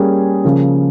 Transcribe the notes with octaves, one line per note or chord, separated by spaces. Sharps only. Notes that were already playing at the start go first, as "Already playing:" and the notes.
Already playing: G3 A#3 C#4 G#4
C#3 F3 A#3